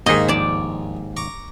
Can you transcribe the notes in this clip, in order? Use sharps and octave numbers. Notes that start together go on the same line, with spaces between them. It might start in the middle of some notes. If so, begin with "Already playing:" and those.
D#2 G#2 A#3 D#4 G#4 D#5
A#1 D5 A5
A#5 C#6 D6